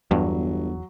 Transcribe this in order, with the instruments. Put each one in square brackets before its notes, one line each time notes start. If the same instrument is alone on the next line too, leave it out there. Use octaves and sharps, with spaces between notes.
[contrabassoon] G1 [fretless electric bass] E2 [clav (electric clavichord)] G2 [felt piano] F#3